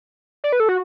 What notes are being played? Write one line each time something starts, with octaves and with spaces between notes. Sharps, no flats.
D5
B4
A4
F#4